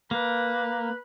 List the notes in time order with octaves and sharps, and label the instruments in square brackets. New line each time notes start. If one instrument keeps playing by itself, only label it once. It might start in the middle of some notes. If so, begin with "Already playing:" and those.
[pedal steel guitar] A#3 [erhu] B4